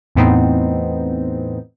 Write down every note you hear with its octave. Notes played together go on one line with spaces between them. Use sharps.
E2 A2 B3 C4 D#4